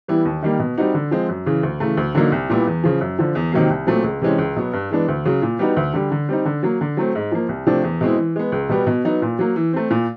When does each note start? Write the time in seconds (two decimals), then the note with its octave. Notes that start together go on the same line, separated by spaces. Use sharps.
0.08 E3 G3 B3 E4
0.25 D#2
0.42 D#3 G3 A#3
0.59 B2
0.77 G3 C4 D#4 F#4
0.94 D3
1.11 F3 G#3 C4
1.29 F#2
1.46 C#3 E3
1.63 D2
1.80 C#3 E3 A3
1.97 D2
2.15 D3 F#3 A#3 D#4
2.32 C2
2.50 A#2 G3 B3 E4
2.67 E2
2.84 C#3 F3
3.01 F#2
3.19 D3 F3
3.35 E2
3.52 C3 D#3 F#3 A#3
3.70 C2
3.87 A#2 F#3 A3 C4
4.04 C#2
4.22 C3 E3 G#3 C#4
4.38 C#2
4.56 B2 F#3 B3
4.73 G2
4.91 E3 G#3 B3 D4
5.08 D2
5.25 C#3 F#3
5.42 A#2
5.59 G3 B3 D#4 F#4
5.76 D2
5.94 D3 G3
6.11 D3
6.29 G3 C4 D#4
6.45 D3
6.63 F#3 A#3
6.81 D3
6.97 F#3 A3 C4
7.15 G#2
7.32 F3 A#3
7.49 C2
7.66 C3 F3 A3 D4
7.84 E2
8.01 B2 G#3 C4 E4
8.18 E3
8.36 G#3 B3
8.52 C#2
8.69 B2 G3 B3
8.87 B2
9.05 F#3 B3 D#4
9.22 A#2
9.39 F#3 A#3
9.56 E3
9.73 A3 C4
9.90 A#2